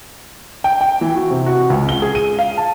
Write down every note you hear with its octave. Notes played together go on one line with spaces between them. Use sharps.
G5
G5
E3
F#4
C3
F#4
C#2
G7
G#4
D#7
F5
A5